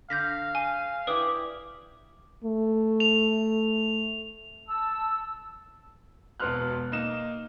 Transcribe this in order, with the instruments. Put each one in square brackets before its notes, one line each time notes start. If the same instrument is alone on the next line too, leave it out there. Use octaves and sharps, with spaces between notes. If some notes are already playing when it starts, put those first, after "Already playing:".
[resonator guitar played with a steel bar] D3 [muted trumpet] F5 [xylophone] G6 A#6 B6
[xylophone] G#5
[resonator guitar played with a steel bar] E4 G4 D5 [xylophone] B4 D#6
[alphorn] A3
[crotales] F7
[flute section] A5 E6
[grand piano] E1 B2 B3 C6 F6 F#6
A#3 D#4 E7